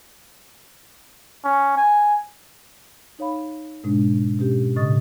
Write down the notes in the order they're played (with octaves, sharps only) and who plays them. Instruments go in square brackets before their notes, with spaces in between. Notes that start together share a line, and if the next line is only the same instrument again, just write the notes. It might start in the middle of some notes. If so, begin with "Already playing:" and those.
[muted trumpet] C#4
G#5
[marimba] D#4 C#5 F5 B5
G#2 B2 G#3 D4
B2 C#4 G4
A2 C#3 D#5 C#6 D#6 A6